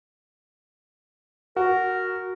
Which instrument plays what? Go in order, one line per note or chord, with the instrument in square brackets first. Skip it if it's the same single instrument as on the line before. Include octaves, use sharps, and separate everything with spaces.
[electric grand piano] F#4 [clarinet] A#4